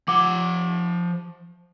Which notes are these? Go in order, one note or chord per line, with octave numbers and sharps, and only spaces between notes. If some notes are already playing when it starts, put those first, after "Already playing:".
F3 F#5 D6